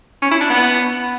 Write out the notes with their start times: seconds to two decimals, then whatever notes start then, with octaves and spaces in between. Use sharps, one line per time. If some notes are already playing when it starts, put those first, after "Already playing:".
0.22 C#4
0.31 E4
0.41 D4
0.50 B3